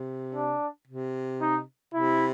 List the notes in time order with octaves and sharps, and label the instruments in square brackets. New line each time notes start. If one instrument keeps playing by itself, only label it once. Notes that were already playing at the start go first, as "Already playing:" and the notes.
Already playing: [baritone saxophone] C3
[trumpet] D4
[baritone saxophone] C3
[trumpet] D#4
[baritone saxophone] C3 [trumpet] E4